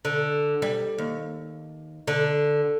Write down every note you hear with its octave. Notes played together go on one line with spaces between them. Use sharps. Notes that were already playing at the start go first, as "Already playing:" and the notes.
D3
G3
D#2
D3